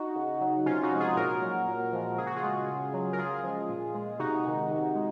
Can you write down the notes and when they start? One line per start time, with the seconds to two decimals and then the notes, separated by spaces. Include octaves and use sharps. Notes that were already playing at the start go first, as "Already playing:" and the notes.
Already playing: D#4 F#4
0.16 C#3
0.41 F#3
0.66 C3 C#4 F4
0.83 D#4 F#4
0.92 F3 G#3
1.00 F4 G#4
1.16 A#2 F#4 A#4
1.42 F#3
1.67 A#2
1.93 F3 G#3
2.18 C#3 G#4
2.27 F#4
2.36 F4 G#4
2.43 G#3
2.68 C#3
2.94 F#3
3.13 A#4
3.18 C#3 F4 G#4
3.43 F3 G#3
3.69 A#2
3.94 G#3
4.19 C3 D#4 F#4
4.45 D#3 G#3
4.70 C3
4.95 G#3